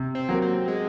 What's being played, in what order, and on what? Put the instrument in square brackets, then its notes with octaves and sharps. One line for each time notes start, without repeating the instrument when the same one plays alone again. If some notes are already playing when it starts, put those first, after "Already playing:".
Already playing: [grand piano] C3
[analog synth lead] C4
[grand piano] F#3 A#3
[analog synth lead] C4
G#3